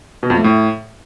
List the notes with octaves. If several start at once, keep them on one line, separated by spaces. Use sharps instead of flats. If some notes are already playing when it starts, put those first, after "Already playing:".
B2
F2
A3
A2